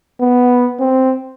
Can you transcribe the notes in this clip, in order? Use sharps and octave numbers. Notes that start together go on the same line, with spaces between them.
B3
C4